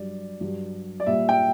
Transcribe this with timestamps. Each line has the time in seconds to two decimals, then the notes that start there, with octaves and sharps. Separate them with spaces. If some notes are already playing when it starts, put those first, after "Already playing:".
Already playing: G2 F#3 D5
0.41 G2 F#3
1.00 D5
1.06 A#2 G3 E5
1.29 G5